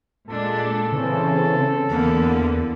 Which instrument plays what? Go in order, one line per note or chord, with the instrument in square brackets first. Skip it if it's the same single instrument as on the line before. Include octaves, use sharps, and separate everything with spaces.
[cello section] A#2 G#3 D4 [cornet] A4
[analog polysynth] C#3 E3 C#4 [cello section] C4
[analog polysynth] E2 [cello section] D3 [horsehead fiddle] A#3 B3